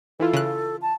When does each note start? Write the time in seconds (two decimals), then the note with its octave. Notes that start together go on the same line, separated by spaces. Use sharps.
0.20 E3 E4 F4 A4
0.33 C#3 F#6
0.81 A5